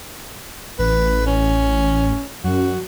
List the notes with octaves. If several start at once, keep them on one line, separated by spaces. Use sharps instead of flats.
A1 B4
C#4
F#2 F#4